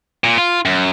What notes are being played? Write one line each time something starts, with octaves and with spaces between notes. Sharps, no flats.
A#2
F4
F#2